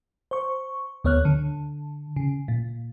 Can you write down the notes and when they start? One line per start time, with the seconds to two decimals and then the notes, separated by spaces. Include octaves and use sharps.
0.31 C5 C#6
1.04 D2 B3 C#5 F6 F#6
1.25 D3
2.16 C#3
2.48 A#2